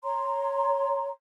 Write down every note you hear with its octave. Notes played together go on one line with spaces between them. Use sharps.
C#5 A#5 C6